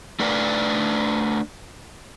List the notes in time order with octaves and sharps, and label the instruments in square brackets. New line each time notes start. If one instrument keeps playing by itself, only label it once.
[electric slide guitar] A3 D4 B4 D5 E5 F5